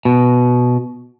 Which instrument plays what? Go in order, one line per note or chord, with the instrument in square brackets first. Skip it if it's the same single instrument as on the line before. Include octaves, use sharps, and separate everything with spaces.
[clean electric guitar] B2